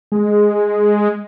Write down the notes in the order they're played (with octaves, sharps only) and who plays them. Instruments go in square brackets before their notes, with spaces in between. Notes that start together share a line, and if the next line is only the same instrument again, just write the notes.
[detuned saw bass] G#3